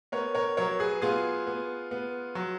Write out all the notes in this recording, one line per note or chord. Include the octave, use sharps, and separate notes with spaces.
B3 A#4 C#5
A#4 C#5
F#3 A#4 C#5
G#4 B4
B3 F4 G#4
B3
B3
F#3